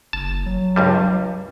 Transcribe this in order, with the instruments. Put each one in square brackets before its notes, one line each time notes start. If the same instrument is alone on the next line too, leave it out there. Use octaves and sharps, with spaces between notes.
[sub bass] F#1 [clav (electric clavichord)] A5
[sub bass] F#3
[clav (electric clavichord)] C#2 G2 G3